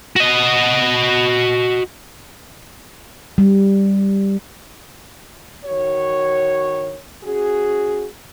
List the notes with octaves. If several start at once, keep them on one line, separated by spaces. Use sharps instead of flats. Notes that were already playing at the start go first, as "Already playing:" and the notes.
F#4 D#5
G3
D#3 F#4 C#5
C#4 F#4 G#4